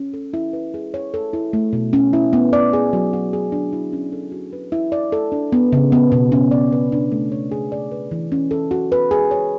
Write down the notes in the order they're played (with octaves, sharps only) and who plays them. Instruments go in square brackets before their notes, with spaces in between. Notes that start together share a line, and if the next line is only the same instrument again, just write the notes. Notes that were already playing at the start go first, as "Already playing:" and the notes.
Already playing: [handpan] C#4
A4
E4
B4
G#4
C#5
A4
E4
A3
B2
C#4
E4
B3
D5
G#4
F#3
F#4
G#4
D4
E4
C#4
A4
F#4
B4
E4
D5
A4
D4
B3
C#3
B3
B2
C#4
D5
B4
D4
A3
C#5
G#4
D5
B4
E3
C#4
A4
F#4
B4
G#4
C#5